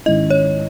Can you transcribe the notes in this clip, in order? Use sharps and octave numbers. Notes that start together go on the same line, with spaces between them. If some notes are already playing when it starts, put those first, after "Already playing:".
G#2 D#3 G#3 C#4 E4 D#5
C#5